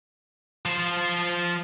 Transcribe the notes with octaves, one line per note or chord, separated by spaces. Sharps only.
F3 C5